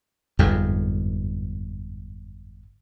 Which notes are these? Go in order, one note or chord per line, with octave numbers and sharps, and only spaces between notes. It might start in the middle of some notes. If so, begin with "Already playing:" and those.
G1 F2 G#2